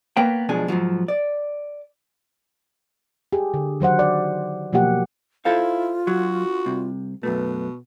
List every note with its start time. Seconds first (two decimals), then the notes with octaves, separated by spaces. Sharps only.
0.17 A#3 B3 B4 C#5 F5 G5
0.49 B1 B2 F3 G#3 D4 G#5
0.68 G#2 B2 F3 F#3
1.08 D5
3.33 G4 G#4
3.54 D3
3.80 D#3 F#3 C5 F#5
3.99 D5
4.73 B2 F3 F#3 A#3 G4 F#5
5.45 E4 F4 A4 C5 F5
6.07 F#3 F#4
6.66 C2 C3
7.23 F#2 B2 A3 B4